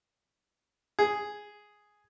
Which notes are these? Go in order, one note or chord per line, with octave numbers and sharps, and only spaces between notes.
G#4